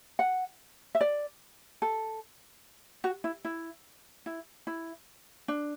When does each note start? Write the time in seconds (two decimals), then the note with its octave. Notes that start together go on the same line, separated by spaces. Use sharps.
0.19 F#5
0.95 E5
1.01 D5
1.82 A4
3.04 F#4
3.24 E4
3.45 E4
4.26 E4
4.67 E4
5.48 D4